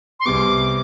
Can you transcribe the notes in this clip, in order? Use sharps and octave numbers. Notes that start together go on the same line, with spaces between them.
C6
C2 C3 G3 B3 D6